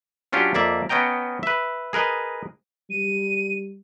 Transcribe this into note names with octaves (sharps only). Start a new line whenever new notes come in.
F#3 C#4 D4 F4 G4
F2 A#3 D5 E5
B3 C#4 D#5 G5 A#5
B4 E5
G#4 A#4 B4 D#5
G3 D#7